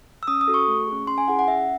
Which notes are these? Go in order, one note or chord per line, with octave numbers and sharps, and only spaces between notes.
E6
C#4 D#6
D#6
F#4 A4
C#6
A3
C#4 G#4
C#4 C6
G#5
E4 G#4 F#5
F#5
C#4 E5